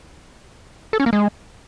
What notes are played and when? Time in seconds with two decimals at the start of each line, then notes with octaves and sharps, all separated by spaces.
0.93 A4
1.00 C#4
1.06 A#3
1.13 G#3